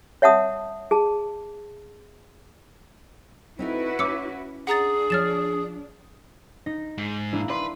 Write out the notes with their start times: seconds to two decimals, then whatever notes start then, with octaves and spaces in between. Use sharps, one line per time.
0.22 C#5 E5 F#5 A5 D#6
0.91 G#4 A5
3.59 C4 D#4 E4 F#4 A4 B4
3.99 C#4 D6 E6 C#7
4.67 D4 G#4 F#5 A#5 A6
5.10 F3 C#5 F6 A6 E7
6.66 D#4 A#6
6.98 G#2
7.33 A#3 D4 E4
7.50 D4 B4 D5 C6